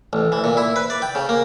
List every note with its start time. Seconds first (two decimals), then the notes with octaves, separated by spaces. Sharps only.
0.13 A1
0.32 E3
0.44 A#2
0.57 E4
0.76 B4
0.90 D5
1.02 G5
1.15 C#3
1.29 A#3